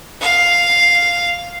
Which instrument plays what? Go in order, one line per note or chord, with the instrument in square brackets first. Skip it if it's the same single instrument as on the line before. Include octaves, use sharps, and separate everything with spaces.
[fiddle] F5